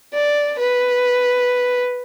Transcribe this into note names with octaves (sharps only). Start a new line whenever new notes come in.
D5
B4